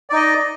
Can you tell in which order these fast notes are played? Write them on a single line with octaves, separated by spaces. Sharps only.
D5 D#4 D#5